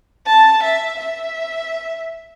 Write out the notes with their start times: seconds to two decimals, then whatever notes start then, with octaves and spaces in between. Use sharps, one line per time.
0.26 A5
0.63 E5
0.99 E5